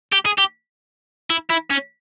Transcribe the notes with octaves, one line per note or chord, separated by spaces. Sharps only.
G4
G#4
G4
E4
E4
C#4